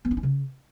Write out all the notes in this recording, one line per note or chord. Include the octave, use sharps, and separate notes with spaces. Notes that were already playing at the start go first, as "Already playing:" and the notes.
B3
D4
D#4
C#3